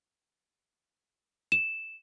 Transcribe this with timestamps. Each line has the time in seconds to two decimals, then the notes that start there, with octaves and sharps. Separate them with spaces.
1.52 E7